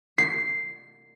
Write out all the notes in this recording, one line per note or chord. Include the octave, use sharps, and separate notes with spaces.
C7